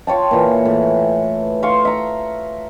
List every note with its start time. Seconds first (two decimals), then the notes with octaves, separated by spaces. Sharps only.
0.07 F4 C#5 G5 A5
0.31 A#2 E3
0.65 A2
1.63 F5 C6 C#6
1.85 E5 A#5